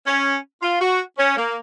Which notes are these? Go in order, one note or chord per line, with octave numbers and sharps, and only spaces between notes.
C#4
F4
F#4
C#4
A#3